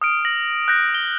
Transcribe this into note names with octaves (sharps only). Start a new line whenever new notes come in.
D#6 F6 D7
A#6 F#7
F#6 G6 A#6
G7